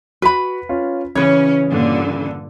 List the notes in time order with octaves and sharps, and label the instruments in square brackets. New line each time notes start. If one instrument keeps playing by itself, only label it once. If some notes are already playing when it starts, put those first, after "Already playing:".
[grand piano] F#4 B6 [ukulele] B4 B5
[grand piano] C#4 F4
[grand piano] C#3 E3 [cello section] C#4 [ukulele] B4 C#5
[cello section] G2 A#2 D3